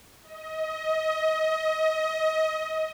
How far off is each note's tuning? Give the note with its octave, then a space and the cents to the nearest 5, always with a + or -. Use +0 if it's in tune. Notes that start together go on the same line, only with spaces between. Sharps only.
D#5 +25